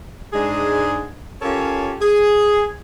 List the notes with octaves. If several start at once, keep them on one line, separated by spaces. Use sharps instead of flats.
G#2 G#3 D4 G#4
C#4 F4 G4 A4 A#4 C#5
G#4